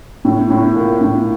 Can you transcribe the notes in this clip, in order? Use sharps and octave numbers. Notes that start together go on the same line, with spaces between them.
A2
A2
A#2
A2